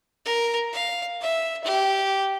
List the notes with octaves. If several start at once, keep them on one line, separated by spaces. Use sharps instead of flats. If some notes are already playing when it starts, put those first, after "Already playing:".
A#4
F5
E5
G4